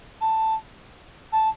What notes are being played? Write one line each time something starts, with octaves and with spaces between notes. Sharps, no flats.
A5
A5